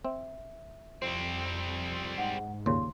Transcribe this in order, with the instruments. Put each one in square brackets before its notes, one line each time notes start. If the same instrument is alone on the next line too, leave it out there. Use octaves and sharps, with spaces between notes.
[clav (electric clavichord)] C4 [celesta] E5
[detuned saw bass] F2 [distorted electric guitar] G3 C4 [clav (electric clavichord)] C5
[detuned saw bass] G#2 [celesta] F#5
[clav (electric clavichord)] D#2 A#2 C#3 [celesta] F5 C6